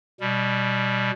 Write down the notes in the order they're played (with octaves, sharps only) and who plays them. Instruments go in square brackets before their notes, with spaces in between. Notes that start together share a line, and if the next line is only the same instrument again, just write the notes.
[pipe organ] B2 G3